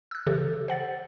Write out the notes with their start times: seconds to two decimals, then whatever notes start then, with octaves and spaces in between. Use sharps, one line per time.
0.11 E6 F#6
0.27 C#3 E3 G4 A4
0.68 C5 F#5 A6